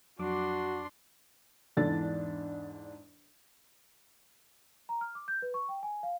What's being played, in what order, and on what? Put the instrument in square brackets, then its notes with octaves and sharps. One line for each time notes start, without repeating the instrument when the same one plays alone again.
[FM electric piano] F2 F#3 D6 [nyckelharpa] D4 C6 [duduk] F#4
[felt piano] E2 G#2 E3 D4 A4 A6
[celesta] A#5
F6
D6
G6
B4
C#6
G5
G#5
F5